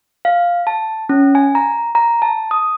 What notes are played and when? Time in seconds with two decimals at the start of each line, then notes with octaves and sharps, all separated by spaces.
0.25 F5
0.67 A5
1.09 C#4
1.35 G#5
1.55 A#5
1.95 A#5
2.22 A5
2.51 D#6